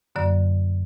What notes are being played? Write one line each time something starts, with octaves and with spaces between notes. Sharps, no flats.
F#2 D3 F#3 A#3 D5